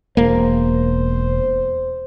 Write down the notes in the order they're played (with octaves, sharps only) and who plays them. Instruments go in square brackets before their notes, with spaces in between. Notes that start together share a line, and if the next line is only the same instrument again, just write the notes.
[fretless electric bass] E1 A#3 [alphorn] C5